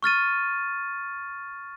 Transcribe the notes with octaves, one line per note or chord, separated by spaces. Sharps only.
C#6 F6 A6 D#7